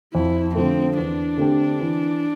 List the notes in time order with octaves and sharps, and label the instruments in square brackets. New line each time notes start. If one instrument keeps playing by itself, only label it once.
[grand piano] F2 [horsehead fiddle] E4
[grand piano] D3 F3 A3 [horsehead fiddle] C4
[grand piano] E2 [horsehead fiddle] D4
[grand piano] D3 A3 C4 G4
E3